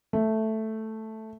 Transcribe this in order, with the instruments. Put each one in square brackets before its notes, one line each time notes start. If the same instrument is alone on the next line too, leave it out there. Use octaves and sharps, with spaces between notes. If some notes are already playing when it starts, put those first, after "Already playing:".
[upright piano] A3